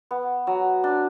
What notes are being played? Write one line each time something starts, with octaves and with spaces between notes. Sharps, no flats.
B3
F#3
D4